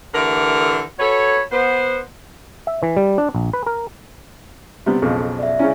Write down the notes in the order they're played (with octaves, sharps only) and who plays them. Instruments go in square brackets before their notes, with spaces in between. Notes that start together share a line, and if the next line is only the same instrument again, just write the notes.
[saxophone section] D3 E3 A3 G4 A#4
F#4 A4 B4 C#5
B3 C5
[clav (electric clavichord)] E5
E3
G3
D4
A#1
B4
A#4
[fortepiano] C3 G3 B3
B1 F2 C#3
[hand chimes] D5 E5
[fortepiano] C#3 C#4 [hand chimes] E4 G#5